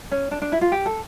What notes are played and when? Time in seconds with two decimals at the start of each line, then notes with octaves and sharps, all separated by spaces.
0.11 C#4
0.31 D4
0.42 D4
0.52 E4
0.61 F4
0.72 G4
0.86 A4